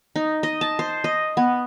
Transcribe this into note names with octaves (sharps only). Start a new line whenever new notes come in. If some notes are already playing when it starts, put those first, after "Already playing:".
D#4
D#5
A5
C5
D#5
B3